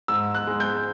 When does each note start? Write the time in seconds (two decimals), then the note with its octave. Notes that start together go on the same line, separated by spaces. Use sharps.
0.08 G#2 E6
0.34 F#6
0.47 G#3
0.60 G6